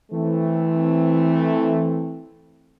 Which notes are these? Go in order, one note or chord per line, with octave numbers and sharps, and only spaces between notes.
E3 A3 C4